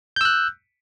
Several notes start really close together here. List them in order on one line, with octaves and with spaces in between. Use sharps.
G6 E6 F#6